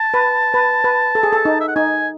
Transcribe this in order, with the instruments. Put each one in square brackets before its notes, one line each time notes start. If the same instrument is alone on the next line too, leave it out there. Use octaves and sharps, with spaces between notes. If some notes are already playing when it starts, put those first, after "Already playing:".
Already playing: [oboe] A5
[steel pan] B4
B4
B4
A4
G#4
A4
D#4
[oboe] E5
F#5
[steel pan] D#4 [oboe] G#5